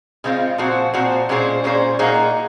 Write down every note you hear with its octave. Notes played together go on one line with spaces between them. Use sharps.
C#3 G#3 C4 F4
A#2 F3 C4 F#4 C5
A#2 F3 C4 F#4 C5
A#2 G#3 C#4 G#4 C5
A#2 G#3 C#4 G#4 C5
A#2 F#3 A#3 D#4 G#4